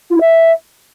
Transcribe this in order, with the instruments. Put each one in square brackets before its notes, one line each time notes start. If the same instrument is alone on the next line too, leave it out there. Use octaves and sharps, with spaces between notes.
[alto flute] F4
E4
E5